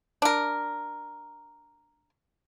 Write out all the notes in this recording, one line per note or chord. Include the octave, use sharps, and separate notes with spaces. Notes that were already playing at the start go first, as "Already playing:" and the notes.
D4 A#4